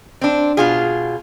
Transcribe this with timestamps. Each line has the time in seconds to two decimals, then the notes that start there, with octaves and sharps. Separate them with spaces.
0.21 C4 D4
0.57 B2 F4 G#4